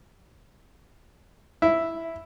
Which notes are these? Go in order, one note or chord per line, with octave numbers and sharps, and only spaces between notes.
E4